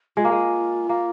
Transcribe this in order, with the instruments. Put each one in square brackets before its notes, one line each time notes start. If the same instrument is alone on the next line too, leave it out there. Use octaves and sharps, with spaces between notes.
[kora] G#3 [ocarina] F4
[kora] A#3
G#3
A#3